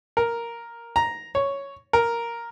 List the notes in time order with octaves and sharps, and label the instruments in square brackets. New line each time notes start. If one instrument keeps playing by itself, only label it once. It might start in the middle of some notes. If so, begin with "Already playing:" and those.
[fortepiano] A#4
A#5
C#5
A#4